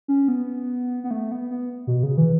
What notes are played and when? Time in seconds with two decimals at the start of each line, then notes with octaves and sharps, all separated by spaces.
0.08 C#4
0.28 B3
1.04 B3
1.11 A3
1.32 B3
1.51 B3
1.87 B2
2.03 C#3
2.17 E3